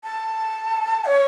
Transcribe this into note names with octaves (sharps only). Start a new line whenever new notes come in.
A5
C#5